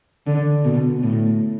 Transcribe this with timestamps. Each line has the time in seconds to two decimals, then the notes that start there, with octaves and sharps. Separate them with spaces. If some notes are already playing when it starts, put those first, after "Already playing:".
0.27 D3
0.65 B2
1.03 A2